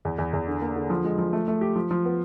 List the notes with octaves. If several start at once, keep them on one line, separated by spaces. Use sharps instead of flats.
E2
E2
E2
D3
A#3
D3
F3
G#3
F3
A3
A3
G4
F3
F3
B3